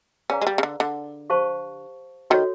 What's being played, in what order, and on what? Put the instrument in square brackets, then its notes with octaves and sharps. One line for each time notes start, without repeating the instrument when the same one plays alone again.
[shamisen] C#4 [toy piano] G#4 B4 D5 F5 A#5
[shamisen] G#3
G3
C#3
D3
D3
[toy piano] G4 C5 F5 A5 C#6
[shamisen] D#3 [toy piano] F#4 A4 C#5